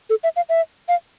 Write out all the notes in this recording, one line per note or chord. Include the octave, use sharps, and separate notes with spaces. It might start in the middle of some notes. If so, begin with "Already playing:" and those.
A4
E5
F5
E5
F5